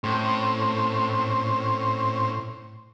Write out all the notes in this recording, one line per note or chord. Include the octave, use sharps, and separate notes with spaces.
A2 C4 C#4 C5